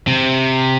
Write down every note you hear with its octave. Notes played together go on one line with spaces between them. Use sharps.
C3